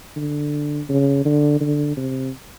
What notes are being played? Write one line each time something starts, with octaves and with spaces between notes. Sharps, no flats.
D3
C#3
D3
D3
C3